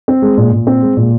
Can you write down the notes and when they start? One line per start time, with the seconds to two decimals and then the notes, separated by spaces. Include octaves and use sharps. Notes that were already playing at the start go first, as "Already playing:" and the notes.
0.08 C4
0.22 G#3
0.38 A#2
0.53 A#2
0.67 C4
0.82 G#3
0.97 A#2